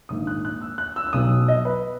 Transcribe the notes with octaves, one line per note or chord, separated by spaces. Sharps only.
A#1 G#2 D#3 A#3 D#6
F#6
F#6
E6
F#6
E6
E6
B1 B2 F#3 D#6
D#5
B4